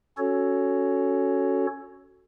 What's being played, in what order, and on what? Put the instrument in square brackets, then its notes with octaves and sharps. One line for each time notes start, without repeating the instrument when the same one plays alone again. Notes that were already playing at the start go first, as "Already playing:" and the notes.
[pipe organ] C#4 F#4 A4 C#5